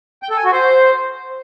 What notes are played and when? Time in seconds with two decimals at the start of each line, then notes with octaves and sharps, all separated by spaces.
0.23 G5
0.30 A4
0.37 G#5
0.45 F#4
0.52 C5